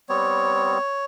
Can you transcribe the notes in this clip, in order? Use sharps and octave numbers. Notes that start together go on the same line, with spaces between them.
G3 B3 C4 C#5